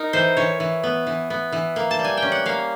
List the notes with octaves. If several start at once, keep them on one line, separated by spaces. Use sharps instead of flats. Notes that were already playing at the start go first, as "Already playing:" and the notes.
Already playing: D#4 A#4
E3 C5
E3 C#5
E3
B3
E3
B3
E3
A#3
A5
G3
G#5
C#4 G5
F#5
A#3 F5